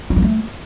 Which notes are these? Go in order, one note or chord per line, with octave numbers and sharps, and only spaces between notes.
F#3
F3
A3